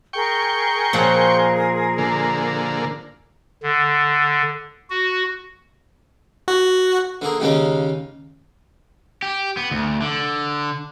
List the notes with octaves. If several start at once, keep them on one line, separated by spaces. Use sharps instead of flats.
G#4 A#4 G5 C#6
A#2 F3 F#5
D3 A#3
D3
F#4
F#4
D3 A#3 G#4
D#2 C#3 G#3 A#3 C#4
G4
B3
D2
D3